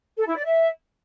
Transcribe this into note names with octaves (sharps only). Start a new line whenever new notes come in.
A4
E4
D5
E5